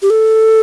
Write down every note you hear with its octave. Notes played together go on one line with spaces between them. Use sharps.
G4
A4